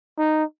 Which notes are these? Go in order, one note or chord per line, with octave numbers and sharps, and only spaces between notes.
D#4